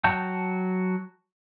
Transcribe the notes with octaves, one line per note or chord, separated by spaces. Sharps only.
F#3 F#4 G5 A5 G6